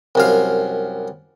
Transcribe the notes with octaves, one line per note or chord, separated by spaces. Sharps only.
C2 F#2 F5